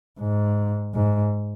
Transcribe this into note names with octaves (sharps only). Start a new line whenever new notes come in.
G#2
G#2